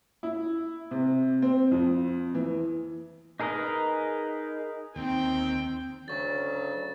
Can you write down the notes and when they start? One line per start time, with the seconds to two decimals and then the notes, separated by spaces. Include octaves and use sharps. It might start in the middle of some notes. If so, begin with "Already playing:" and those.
0.23 E4
0.91 C3
1.42 C4
1.72 F2
2.35 E3
3.40 D#4 G#4 A#4 B4 D#5
4.96 D#2 C4 G5
6.08 D2 C#3 F#3 C#6 A6